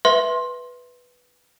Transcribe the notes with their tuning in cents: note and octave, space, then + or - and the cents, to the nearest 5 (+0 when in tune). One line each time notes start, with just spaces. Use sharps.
B4 +0 E5 +0 C6 +15